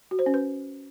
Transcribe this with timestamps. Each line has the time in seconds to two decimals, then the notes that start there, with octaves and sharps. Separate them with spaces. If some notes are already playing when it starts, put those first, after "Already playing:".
0.11 F#4
0.19 C5
0.26 C#4
0.34 B4